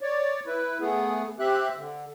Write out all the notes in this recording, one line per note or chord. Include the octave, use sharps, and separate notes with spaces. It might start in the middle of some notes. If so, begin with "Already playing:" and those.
C#5 D5
E4 B4
A3 B3 G#4
C4 G4 E5 F#6
D3